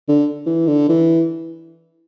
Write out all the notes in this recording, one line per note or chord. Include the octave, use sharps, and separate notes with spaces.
D3
E3
D3
E3